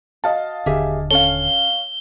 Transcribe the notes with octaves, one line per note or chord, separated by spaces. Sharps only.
F#4 D#5 F5 A5
D#1 D3 G4 G#4 E5
C#4 A4 C#5 F5 G7